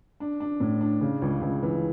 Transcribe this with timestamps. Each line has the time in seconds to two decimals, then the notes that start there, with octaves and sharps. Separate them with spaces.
0.20 D4
0.40 D4
0.60 A2
0.81 D4
1.01 C#3
1.22 C#2
1.41 C#2
1.63 E3